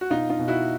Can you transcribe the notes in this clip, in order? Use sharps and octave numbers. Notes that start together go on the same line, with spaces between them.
F#4
B2 D#4 F4
D#4 F4
B2
E4 F#4